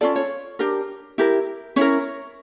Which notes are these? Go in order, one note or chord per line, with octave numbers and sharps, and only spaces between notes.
C#4 F4 A4 D5
C#5
D4 G4 A#4
E4 G4 A#4
C#4 E4 A#4 C#5